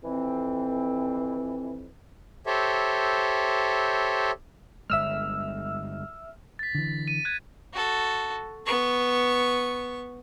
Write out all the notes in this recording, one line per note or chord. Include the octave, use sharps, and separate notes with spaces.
F2 E3 C4
G4 A4 C5 C#5 E5
G1 C#2 G#3 E5 E6 F6
A6 B6
D3 E3
D#7
F#6 G#6 D#7
F#4 A4
B3 C#6